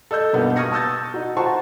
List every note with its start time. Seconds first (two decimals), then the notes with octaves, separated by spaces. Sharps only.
0.11 A4 D#5 E6 G6
0.33 G2 B2 A#3 B3 D#4
0.56 C#6 D#6 F6 G#6 A#6 C#7
0.72 A5 D#6 E6 G6 A6
1.14 D#4 F#4
1.36 F4 C5 F#5 A5 A#5 C#6